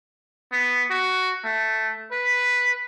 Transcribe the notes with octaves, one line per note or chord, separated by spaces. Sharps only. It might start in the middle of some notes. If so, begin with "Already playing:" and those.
B3
F#4
A3
B4